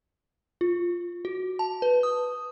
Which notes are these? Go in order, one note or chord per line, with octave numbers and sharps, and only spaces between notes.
F4
F#4
A5
B4
D#6